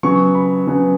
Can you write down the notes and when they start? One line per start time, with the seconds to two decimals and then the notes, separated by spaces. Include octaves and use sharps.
0.03 C#3 F#3 B3 C#6
0.35 B5
0.67 C#3 F#3 B3